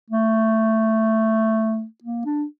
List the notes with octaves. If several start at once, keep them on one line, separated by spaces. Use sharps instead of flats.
A3
A#3
D4